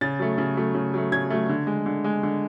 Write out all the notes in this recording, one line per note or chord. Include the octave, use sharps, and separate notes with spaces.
C#3 A6
F#3 A3
C#3
F#3 A3
C#3
F#3 A3
C#3 G#6
F#3 A3
D3
G#3
D3
G#3
D3